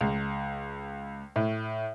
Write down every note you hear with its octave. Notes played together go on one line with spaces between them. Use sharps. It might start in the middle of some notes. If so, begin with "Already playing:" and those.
C#2
A2